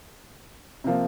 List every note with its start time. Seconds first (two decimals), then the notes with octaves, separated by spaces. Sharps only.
0.84 C3 F3 A#3